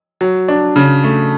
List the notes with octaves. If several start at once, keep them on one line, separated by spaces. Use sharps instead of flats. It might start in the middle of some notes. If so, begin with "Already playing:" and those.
F#3
D4
C#3
A3